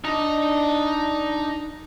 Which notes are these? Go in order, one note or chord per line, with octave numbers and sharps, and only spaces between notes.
D4 D#4 D#5